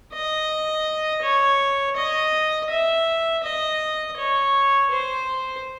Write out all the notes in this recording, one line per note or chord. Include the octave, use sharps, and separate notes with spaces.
D#5
C#5
D#5
E5
D#5
C#5
C5